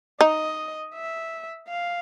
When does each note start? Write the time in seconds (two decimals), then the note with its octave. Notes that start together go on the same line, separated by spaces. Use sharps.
0.21 D#4 D#5
0.95 E5
1.69 F5